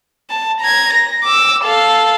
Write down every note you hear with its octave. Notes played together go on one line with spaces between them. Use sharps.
A5
A#5 G#6
A#6
D6 E6
A4 F5